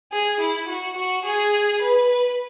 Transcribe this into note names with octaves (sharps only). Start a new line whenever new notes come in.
G#4
E4
F#4
F#4
G#4
B4